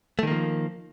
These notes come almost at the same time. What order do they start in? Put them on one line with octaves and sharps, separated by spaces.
A3 D#3 A#3 F3